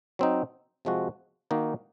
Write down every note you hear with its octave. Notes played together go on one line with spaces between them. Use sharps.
F#3 C4 D#4
C3 F3 G#3 C4 F#4
D#3 A#3 D#4 F#4